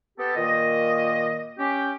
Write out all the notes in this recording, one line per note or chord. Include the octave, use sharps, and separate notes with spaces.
B3 G4 A4
A#2 D#3 A#3 D#5
C#4 G4